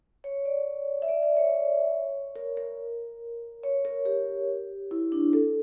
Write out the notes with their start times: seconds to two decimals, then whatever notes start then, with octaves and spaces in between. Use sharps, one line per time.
0.24 C#5
0.45 D5
1.02 E5
1.08 D5
1.23 D5
1.37 C#5
2.36 A#4
2.57 A#4
3.64 C#5
3.85 A#4
4.05 G4
4.91 E4
5.12 D4
5.33 A4